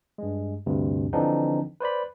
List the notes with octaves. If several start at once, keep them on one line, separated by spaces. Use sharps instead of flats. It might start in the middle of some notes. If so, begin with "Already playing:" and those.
G2 G#3
D2 G2 C3
D3 E3 F3 C4 D4 D#4
B4 C5 D5 B5